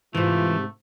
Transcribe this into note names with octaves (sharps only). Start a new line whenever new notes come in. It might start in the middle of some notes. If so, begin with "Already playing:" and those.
G#2 C3 E3 A3 F4